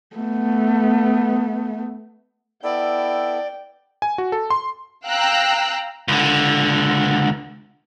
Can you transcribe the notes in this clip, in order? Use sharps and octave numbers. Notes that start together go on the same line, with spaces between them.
A3 B3
B3 E4 A4 D5 G5
G#5
F#4
A4
C6
F5 G5 A#5 E6 F#6
C#2 D3